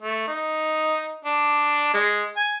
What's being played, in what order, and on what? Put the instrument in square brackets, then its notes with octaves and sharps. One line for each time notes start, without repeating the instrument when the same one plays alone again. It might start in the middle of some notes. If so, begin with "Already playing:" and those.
[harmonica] A3
D#4
D4
G#3
G#5